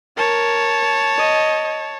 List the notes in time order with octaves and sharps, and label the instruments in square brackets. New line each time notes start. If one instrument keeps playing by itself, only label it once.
[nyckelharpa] A#4 [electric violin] C#5 A5
[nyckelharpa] D#5